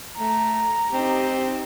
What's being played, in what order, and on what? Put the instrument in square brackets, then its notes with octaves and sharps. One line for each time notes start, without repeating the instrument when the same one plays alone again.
[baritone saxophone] A3 [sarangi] A#5
[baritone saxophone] C4 [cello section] D#4 G4